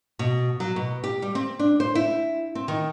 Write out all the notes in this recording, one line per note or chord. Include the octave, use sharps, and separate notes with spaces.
B2
F#3
B2
G4
G3
C4
D4
C5
E4
C4
D#3